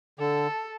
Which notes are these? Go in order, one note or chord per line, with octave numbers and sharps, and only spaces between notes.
D3 A4